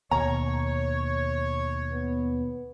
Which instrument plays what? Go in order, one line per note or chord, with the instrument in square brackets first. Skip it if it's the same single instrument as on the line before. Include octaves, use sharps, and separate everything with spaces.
[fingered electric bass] D#2 B2 [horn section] C#5 [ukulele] A#5
[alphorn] B3